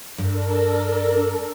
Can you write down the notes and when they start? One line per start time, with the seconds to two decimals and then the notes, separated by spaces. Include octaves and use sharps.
0.18 G2 D4 A4 A#4